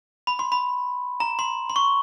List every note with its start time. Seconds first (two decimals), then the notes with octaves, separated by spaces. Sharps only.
0.27 B5
0.39 C6
0.52 B5
1.20 A#5
1.39 C6
1.70 C6
1.76 C#6